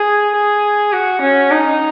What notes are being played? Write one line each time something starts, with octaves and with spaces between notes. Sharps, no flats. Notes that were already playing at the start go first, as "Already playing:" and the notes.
Already playing: G#4
G#4
F#4
C#4
D#4